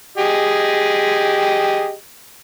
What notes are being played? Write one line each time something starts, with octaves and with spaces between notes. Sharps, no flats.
G4 G#4 D#5